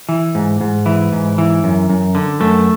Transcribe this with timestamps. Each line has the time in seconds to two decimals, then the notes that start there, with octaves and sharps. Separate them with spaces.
0.09 E3
0.35 G#2
0.61 G#2
0.86 E3
1.12 G#2
1.38 E3
1.64 F#2
1.90 F#2
2.15 D3
2.40 F#2 A3